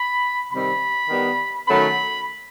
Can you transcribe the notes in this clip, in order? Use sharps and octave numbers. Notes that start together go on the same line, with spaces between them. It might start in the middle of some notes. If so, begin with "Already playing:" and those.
Already playing: B5
C3 D#3 G3 C4 B5
D#3 G3 B3
D#3 F#3 A3 C#4 B5